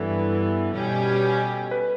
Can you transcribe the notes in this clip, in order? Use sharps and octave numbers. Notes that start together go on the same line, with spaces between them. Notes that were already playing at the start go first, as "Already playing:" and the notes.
Already playing: G2 E3 B3 A4
B2 G3 C#4 G4
B4